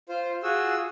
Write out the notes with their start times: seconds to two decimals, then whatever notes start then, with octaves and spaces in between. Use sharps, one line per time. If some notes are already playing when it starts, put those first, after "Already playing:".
0.09 F4 C5
0.43 F4 F#4 G#4 E6